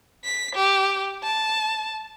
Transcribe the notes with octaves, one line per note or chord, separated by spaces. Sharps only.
B6
G4
A5